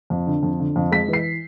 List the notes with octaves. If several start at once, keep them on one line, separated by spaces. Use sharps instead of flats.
F2
D3
F2
D3
F2
G#3 B6
E3
C7